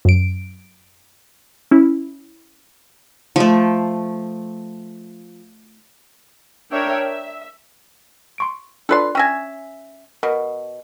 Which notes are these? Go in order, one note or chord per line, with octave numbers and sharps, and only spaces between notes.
F#2 D7
C#4 E4
F3 A3
D4 A#4 C#5 E5 G5
E5
C6 C#6 D7
D4 F4 A4 B4 D5 C6
C#4 E5 G5 G#5 A#6
B2 A#4